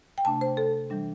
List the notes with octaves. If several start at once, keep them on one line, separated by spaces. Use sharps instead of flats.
G5
C3 A3 D4 A5
C5
A4
E3 G3 D4